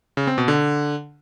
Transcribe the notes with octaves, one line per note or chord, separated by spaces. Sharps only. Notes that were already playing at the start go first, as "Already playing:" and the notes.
C#3
C4
B2
D3